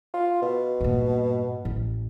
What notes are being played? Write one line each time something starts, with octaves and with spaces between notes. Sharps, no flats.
F4
B2
G2 A#2
A1